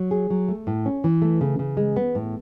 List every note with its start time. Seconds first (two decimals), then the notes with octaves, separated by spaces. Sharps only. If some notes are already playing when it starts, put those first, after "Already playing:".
Already playing: F#3
0.11 G#4
0.30 F#3
0.49 A3
0.67 A2
0.86 C#4
1.04 E3
1.22 A3
1.41 C#3
1.59 C#3
1.77 G#3
1.96 B3
2.15 A2